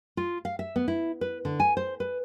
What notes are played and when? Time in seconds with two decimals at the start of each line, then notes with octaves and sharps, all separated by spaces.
0.17 F4
0.45 F5
0.59 E5
0.76 B3
0.88 E4
1.21 B4
1.45 D3
1.60 G#5
1.77 C5
2.00 B4